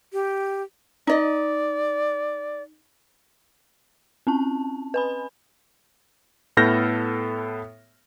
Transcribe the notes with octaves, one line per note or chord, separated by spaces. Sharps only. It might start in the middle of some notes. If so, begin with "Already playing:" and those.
G4
D#4 D5 D#5
C4 C#4 A5
B4 G#5 B5
A2 B3 A4 F6 G6 A#6